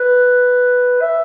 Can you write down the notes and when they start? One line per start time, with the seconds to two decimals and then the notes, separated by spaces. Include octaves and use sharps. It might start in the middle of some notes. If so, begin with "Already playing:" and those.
Already playing: B4
1.01 E5